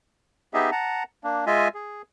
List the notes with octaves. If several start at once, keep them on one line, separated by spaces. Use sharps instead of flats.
B3 D#4 G4 G#4 D#5 E5
F#5 A5 A#5
A#3 D4
G#3 F4 D#5 E5 G#5
G#4